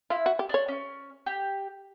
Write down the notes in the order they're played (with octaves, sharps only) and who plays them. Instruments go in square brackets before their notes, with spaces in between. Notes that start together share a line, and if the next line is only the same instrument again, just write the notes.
[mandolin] E4 [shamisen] F4
[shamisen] F#4
G4
[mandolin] D4 [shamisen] C#5
[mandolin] C#4
G4